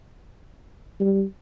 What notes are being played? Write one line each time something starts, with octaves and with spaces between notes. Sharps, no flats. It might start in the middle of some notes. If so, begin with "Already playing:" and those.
G3